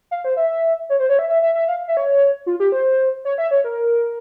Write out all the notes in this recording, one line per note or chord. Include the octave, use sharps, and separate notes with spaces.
F5
C5
E5
C#5
C5
C#5
E5
E5
E5
E5
F5
E5
C#5
F4
G4
C5
C#5
E5
C#5
A#4